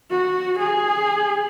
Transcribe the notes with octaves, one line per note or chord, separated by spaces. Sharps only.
F#4
G#4